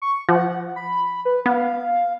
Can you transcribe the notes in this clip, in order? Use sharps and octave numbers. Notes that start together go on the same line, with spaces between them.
C#6
F3 F#5
B5
B4
B3 F5